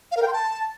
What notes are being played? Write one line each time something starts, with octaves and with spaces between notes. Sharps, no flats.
F5
A#4
G5
C6
A5